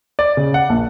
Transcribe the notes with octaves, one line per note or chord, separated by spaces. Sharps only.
D5
C#3
F#5
A#1